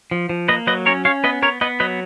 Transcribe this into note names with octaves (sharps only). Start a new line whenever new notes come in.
F3
F3
A#3 B4 D#5
F#3 B4 D#5
C#4 A#4 C#5
C#4 C#5 F5
B3 B4 D#5
B3 A#4 C#5
B3 B4 D#5
F#3 B4 D#5